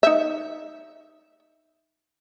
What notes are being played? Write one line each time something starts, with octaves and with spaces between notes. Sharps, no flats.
D#4 E5